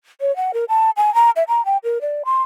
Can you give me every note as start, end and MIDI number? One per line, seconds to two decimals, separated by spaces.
0.21 0.34 73
0.36 0.51 78
0.54 0.65 70
0.69 0.90 81
0.97 1.13 80
1.14 1.30 82
1.36 1.43 76
1.48 1.63 82
1.65 1.77 79
1.84 2.01 70
2.01 2.23 74
2.25 2.42 84